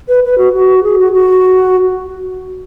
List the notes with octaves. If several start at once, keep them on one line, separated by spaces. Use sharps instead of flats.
B4
B4
F#4
F#4
G#4
F#4
F#4